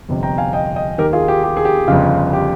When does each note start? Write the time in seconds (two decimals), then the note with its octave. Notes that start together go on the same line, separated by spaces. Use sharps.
0.08 G1 F2 C3
0.23 G5 A#5
0.38 F5 G#5
0.53 D#5 G5
0.76 D#5 G5
0.98 D#2 D#3 G4 A#4
1.13 F4 G#4
1.28 G4
1.43 G4
1.57 G#4
1.65 G4
1.88 G1 F2 C#3 F4
2.33 G4